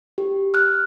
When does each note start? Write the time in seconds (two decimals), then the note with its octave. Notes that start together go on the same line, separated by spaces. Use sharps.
0.18 G4
0.54 F6 F#6